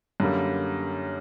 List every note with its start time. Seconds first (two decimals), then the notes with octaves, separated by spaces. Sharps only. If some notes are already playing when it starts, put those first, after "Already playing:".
0.20 F#2 D3 G3 A#3